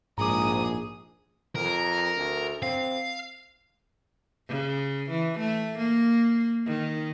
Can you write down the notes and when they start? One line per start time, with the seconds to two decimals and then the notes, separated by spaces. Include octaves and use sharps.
0.18 A#1 G#2 G#4 A#5 D6 D#6
1.55 F2 A#4
2.17 D2
2.62 C4 F5
4.48 C#3
5.10 E3
5.39 A3
5.78 A#3
6.66 D#3